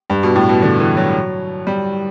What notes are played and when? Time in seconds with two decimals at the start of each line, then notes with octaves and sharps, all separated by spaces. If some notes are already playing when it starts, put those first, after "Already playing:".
0.10 G2
0.23 B2
0.35 A2
0.49 B2
0.62 D3
0.80 E3
0.97 F#3
1.67 G3